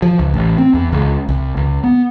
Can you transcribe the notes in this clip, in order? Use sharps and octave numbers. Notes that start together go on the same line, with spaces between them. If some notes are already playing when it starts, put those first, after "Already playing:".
F3
C#2
A1
C4
E2
C#2
C2
C#2
B3